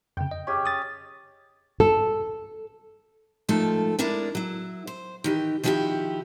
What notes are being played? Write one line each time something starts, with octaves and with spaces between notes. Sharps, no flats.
F2 C#3 G5
D#5
C#4 G4 G#4
D#6 A6
A4
G#2 D#3 F3 A3 A4
G#3 D4 E4 A#4 D5
F#3 E4
C5
D#3 E3 G4
D#3 F3 G3 E4 F#4 G4